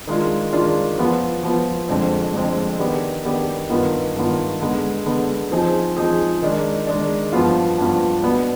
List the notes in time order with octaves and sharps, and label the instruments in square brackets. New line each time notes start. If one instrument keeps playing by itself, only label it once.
[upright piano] D#3 G#3 D4 F4
D#3 G#3 D4 F4
F3 B3 F4
F3 B3 F4
F2 D3 G#3 C4
F2 D3 G#3 C4
D#3 B3 D4 G4
D#3 B3 D4 G4
G2 D#3 B3 F4
G2 D#3 B3 F4
D3 G#3 B3
D3 G#3 B3
F3 C4 D#4 G#4
F3 C4 D#4 G#4
D#3 G#3 D4
D#3 G#3 D4
G2 F3 B3 F4
G2 F3 B3 F4
B2 B3 D4